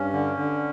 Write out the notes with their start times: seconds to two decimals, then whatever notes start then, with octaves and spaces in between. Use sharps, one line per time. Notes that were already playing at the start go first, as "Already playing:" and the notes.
Already playing: G2 C#4
0.13 D3
0.37 D3